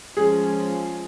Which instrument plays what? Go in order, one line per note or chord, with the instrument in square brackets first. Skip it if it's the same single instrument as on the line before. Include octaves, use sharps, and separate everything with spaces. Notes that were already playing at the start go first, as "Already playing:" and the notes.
[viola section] F3 G#3 C#4 F4 [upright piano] G#4